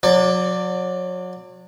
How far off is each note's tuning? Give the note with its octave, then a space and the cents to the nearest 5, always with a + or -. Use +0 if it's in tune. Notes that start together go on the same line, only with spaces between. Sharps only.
F#3 -30 D5 +0